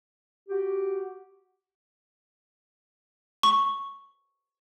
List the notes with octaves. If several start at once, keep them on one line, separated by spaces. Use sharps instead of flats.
F#4 G4
C#6